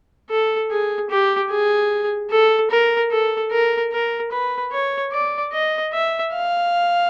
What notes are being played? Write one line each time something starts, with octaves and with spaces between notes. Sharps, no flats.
A4
G#4
G4
G#4
A4
A#4
A4
A#4
A#4
B4
C#5
D5
D#5
E5
F5